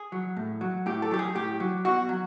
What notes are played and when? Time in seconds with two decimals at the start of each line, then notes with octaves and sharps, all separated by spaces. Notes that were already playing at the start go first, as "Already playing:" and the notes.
Already playing: G#4
0.12 F#3
0.37 A2
0.61 F#3
0.86 A2 G4
1.02 A4
1.11 F#3 G4
1.19 G#4
1.35 A2 G4
1.60 F#3
1.85 B2 F#4
2.09 F#3